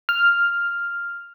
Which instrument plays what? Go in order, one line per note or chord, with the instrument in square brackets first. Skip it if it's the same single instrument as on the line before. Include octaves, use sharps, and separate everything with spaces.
[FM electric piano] F6